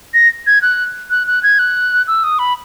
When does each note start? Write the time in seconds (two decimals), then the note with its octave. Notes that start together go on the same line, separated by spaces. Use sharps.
0.14 A#6
0.47 G#6
0.62 F#6
1.10 F#6
1.27 F#6
1.43 G#6
1.59 F#6
2.08 E6
2.23 D#6
2.39 B5